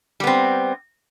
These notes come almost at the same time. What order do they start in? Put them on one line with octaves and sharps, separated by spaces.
G3 B3 C4